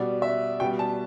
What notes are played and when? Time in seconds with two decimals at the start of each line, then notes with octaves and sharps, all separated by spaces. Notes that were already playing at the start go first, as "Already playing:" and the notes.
Already playing: B2 G3 D5
0.22 E5
0.60 B2 G3 G5
0.79 A5